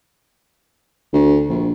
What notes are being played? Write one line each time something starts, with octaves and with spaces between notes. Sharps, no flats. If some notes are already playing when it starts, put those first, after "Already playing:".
D2
A#1